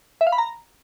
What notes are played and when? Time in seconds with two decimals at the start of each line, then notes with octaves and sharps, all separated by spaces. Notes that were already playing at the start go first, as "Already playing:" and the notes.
0.21 E5
0.27 F5
0.32 B5
0.38 A#5